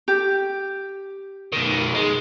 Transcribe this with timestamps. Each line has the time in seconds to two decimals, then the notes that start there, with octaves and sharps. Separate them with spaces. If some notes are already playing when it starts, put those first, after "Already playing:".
0.08 G4
1.53 B2 D#3
1.95 G#3